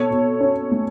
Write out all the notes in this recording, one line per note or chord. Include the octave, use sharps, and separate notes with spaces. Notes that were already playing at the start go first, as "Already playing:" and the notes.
Already playing: B2 A4 C#5
B2
C#4
A3